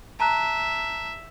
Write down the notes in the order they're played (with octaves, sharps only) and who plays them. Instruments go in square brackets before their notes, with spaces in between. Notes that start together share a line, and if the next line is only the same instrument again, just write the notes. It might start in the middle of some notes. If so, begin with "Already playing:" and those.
[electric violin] E5 [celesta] A5 A#5 F#6